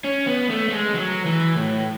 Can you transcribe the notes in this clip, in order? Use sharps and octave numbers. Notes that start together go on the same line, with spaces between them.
C#4
B3
A3
A3
G#3
F#3
E3
A2